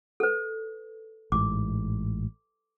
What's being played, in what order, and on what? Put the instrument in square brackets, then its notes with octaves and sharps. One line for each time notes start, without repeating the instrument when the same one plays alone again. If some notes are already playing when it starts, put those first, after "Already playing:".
[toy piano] A4 B4
[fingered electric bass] A1 G#2 [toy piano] D6